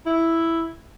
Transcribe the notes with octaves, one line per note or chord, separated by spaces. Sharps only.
E4